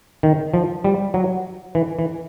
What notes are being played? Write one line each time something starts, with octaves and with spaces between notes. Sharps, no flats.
D#3
F3
G3
F#3
E3
E3